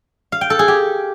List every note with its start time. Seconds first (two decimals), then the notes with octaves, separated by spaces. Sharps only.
0.32 F5
0.41 G5
0.50 A4
0.59 G#4
0.68 G4